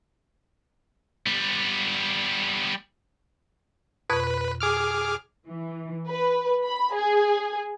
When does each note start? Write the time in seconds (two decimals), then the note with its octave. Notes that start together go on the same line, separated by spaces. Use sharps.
1.26 G3 B3
4.09 F2 B2 B4 C#6
4.60 G#4 D6 F6
5.47 E3
6.08 B4
6.64 B5
6.94 G#4